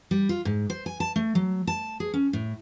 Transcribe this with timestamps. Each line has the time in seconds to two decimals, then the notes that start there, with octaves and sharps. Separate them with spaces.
0.11 G3
0.29 F4
0.45 G#2
0.70 C5
0.86 G#5
1.00 A5
1.16 A3
1.35 F#3
1.67 A5
2.00 G#4
2.14 C#4
2.33 A2